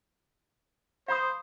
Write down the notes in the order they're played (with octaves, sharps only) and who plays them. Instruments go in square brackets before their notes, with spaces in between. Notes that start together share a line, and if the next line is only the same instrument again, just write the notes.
[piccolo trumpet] C5 [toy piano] F5 B5 D#6